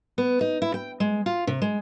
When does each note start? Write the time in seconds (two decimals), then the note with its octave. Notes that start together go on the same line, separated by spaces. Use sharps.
0.18 B3
0.41 D#4
0.62 E4
0.74 G5
1.00 G#3
1.26 F4
1.47 C3
1.62 G#3